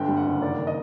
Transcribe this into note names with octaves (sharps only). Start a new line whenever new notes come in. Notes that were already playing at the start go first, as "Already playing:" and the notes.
Already playing: G1 D3 G5
G3
F#5
F#1
D#3 D5
D#5